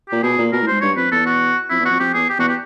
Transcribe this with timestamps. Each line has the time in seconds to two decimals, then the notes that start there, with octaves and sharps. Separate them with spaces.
0.09 A#2 G4
0.23 B2 G#4
0.38 A#2
0.52 B2 A#4
0.62 A2
0.67 G#2 C5
0.81 G2 C#5
0.96 F2 B4
1.11 E2 A4
1.26 F#4
1.70 F2 E4
1.80 E2
1.85 F2 F#4
2.00 F2 G4
2.14 E2 G#4
2.29 G4
2.38 E2 F#4
2.49 G4